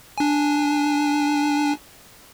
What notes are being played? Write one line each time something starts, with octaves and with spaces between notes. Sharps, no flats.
D4 G#5